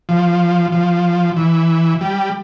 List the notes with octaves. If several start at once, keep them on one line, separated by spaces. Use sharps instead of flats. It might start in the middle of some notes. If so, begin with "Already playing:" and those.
F3
F3
E3
G3